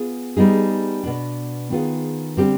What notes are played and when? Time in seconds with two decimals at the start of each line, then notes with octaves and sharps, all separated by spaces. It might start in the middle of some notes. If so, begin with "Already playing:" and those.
Already playing: B3 F4 G#4
0.37 G3 B3 D#4 G#4
1.04 B2 B3 D4
1.70 D#3 B3 F4 G#4
2.37 D3 G3 C4 G4